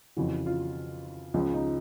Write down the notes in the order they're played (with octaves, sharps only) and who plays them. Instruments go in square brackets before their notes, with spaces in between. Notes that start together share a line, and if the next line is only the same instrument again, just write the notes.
[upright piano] F2 C#3 E3 F#4
F4
C#2 C#3 F3
D#4